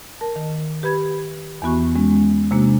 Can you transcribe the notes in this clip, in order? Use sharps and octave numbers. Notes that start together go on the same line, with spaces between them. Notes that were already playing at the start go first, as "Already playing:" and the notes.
A#4 A5
D#3
G4 B4 B5 G#6
E2 E3 B3 F#4 C#6
G#3 C#4
C3 G#3 A#3 D4 F#4